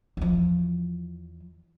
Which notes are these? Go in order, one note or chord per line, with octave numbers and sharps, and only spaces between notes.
E2 F3